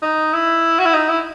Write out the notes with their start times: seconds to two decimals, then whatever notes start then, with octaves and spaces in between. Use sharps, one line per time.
0.02 D#4
0.33 E4
0.79 F#4
0.85 E4
0.94 D#4
1.09 E4